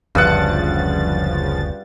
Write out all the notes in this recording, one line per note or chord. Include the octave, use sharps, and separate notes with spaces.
F#1 D2 G2 C#3 F3 F#5 A6